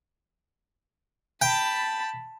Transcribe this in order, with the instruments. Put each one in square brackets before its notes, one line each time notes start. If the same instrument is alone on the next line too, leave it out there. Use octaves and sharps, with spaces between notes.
[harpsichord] G5 [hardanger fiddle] A5 B5